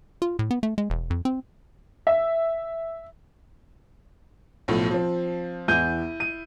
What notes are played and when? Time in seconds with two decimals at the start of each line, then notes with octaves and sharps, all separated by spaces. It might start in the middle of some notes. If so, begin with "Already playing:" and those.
0.22 F4
0.39 A2
0.51 B3
0.63 A3
0.78 G#3
0.90 E1
1.10 F2
1.25 C4
2.07 E5
4.68 B1 A2 F3
4.91 F3 C4
5.68 E2 E4 G6 D#7
6.20 D#7